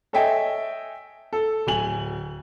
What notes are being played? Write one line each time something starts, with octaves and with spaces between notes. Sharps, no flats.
A4 C#5 D#5 E5 G5 G#5
A4
D1 G#5 F#7